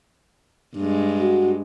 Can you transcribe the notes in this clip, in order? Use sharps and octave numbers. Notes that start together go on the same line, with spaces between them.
G2 G#3
F#4